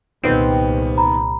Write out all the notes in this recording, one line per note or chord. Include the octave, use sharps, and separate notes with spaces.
C2 A#2 D#3 B3 C4
A#5 B5